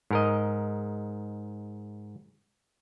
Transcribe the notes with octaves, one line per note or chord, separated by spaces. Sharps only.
G#2 A#4 D#5